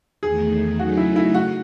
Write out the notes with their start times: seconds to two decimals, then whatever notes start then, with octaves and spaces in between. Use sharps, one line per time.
0.23 E2 D#3 A3 G#4
0.78 C#3 F#3 A3 D#4 F#4
0.97 E4
1.16 E4
1.34 F#4